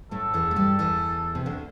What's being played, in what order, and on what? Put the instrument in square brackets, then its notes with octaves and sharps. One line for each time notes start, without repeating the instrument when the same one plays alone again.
[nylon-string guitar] A2 A3 [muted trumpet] A4
[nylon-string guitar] E2 E3
A3
G2 G3
E2 E3
C3
D2 D3